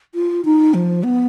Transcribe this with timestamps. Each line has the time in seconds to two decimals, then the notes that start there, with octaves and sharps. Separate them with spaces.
0.15 F4
0.45 D#4
0.74 F3
1.03 B3